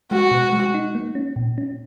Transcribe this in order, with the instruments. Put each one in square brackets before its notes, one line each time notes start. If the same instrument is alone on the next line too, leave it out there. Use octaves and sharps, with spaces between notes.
[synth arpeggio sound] G#3 [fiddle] F#4
[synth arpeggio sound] B2
G#3
D#4
A#3
C#4
A#2
C#4